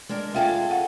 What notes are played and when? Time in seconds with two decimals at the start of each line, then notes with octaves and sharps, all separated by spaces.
0.09 G#3 D4 A#4
0.34 F4 G#4 A4 E5 G5 G#5
0.71 F#5